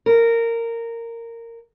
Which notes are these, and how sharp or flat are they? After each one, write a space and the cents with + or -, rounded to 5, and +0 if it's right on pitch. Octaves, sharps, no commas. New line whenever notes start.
A#4 -15